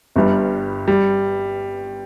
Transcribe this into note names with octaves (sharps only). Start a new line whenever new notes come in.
G1 G2 G3
G3